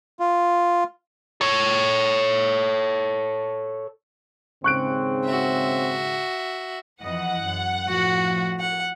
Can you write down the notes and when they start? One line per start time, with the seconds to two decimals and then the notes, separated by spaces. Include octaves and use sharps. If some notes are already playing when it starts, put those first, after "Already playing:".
0.20 F4
1.41 A4 C#5
4.64 D#2 G#2 C#3 C4 C#6 F#6 D7
5.25 F#4 E5
7.02 F2 E3 D#5 F#5
7.40 F#2
7.88 A2 F3 F#4
8.58 F#5